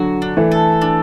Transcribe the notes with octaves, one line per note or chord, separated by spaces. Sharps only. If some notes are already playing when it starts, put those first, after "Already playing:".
Already playing: D3 F#3 F#4
D4
E3 A3
A4
D4